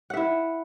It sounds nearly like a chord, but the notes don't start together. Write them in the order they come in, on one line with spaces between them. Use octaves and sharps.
F#5 E5 E4